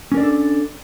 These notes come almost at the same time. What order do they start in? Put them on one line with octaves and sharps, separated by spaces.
C#4 A#4 D5 D4 A4